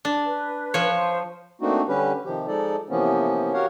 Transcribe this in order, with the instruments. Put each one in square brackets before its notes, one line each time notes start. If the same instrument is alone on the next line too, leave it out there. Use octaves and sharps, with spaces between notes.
[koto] D4
[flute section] B4
[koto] F3 C#5
[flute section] C5
[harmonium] A3 A#3 C4 D4 D#4 F#4
D3 G3 C#4 G4 B4
C3 D#3 F3 G4
F3 G#3 D#4 A4 D5
C3 E3 F3 A#3 B3 C#4
F#4 G4 A#4 C#5 F5 F#5